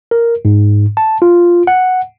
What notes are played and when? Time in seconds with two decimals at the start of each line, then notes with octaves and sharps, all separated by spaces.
0.11 A#4
0.45 G#2
0.97 A5
1.22 F4
1.67 F#5